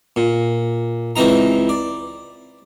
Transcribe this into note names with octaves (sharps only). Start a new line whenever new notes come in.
A#2
C#2 E3 C4 D#4 A#5
D5